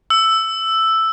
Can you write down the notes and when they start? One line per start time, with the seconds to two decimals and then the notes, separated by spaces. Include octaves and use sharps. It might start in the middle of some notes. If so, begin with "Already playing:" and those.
0.10 E6